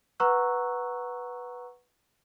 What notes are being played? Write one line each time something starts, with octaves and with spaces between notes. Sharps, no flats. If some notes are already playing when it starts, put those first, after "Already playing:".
B4 F#5 A#5 C#6 E6 F#6